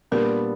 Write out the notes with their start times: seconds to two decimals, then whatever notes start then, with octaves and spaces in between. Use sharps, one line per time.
0.11 A#2 G3 B3 D4 A#4